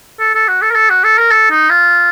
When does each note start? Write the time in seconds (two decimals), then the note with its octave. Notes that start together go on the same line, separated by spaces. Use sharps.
0.20 A4
0.35 A4
0.48 F#4
0.62 A4
0.71 A#4
0.75 A4
0.89 F#4
1.04 A4
1.18 A#4
1.31 A4
1.50 D#4
1.69 F4